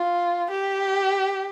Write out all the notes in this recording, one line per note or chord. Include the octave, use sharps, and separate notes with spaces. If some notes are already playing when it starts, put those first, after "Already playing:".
Already playing: F4
G4